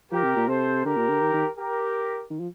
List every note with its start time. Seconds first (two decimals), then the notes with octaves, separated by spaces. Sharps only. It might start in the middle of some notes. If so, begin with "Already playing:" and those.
0.12 F3 G4 A#4
0.24 C3
0.36 A#2
0.48 C3 A4 C5
0.84 D3 G4 A#4
0.97 A#2
1.09 D3
1.21 D#3
1.33 D#3
1.58 G4 A#4
2.30 D#3
2.39 F3